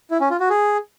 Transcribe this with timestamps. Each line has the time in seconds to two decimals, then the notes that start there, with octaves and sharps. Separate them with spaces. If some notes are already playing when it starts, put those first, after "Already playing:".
0.11 E4
0.21 C#4
0.30 F4
0.40 F#4
0.50 G#4